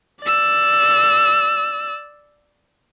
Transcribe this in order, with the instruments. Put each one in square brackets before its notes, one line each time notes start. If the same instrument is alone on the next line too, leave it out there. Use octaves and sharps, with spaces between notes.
[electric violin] D5 E6